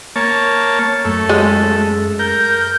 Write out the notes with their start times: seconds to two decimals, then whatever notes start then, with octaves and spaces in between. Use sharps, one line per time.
0.16 A#3 C#5 A5
1.05 F#2 A3
1.29 G#3
2.19 A#4 G6